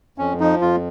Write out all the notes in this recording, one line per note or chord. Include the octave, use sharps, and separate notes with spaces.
F2 C#4
F3 D#4
F2 F4